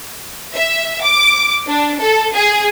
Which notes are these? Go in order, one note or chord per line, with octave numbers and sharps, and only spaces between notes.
E5
D6
D4
A4
G#4